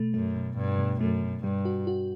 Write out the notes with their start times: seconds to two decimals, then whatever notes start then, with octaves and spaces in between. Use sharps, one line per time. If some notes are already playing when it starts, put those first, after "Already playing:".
Already playing: B2 A3
0.14 F#2 A3
0.35 B2
0.57 G2 B2
0.79 B2
1.00 F#2 A3
1.22 B2
1.43 G2 G3
1.65 F#4
1.87 F#4